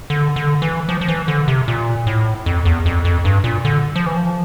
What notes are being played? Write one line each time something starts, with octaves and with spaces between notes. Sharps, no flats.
D3
D3
E3
F3
F3
E3
D3
C3
A#2
A2
F2
E2
F2
F2
G2
A#2
D3
F3
E3
F3